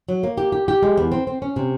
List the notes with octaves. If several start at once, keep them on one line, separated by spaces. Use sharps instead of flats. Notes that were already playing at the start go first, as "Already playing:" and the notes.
F#3
A#3
G4
G4
G4
G#3
E2
C4
C4
C#4
C3